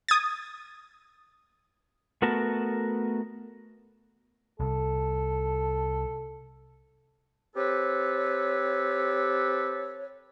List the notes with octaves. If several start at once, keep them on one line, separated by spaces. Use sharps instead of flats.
D#6 G#6 A6
A3 B3 F#4 A#4 A5
C2 A4
C4 G4 A4 B4 C#5